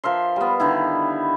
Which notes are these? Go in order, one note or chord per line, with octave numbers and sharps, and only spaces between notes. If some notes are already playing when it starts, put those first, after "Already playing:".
F3 A#4 E5 C6
G3 B3
D3 D#3 E4